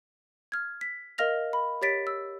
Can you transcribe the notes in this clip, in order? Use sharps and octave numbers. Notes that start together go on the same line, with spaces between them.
F6 G#6
B6
A#4 D#5 F5 F6 A#6 F7
B5
G4 C#5 A6 B6 D7
E6